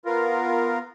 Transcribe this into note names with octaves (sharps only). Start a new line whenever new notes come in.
B3 F4 A#4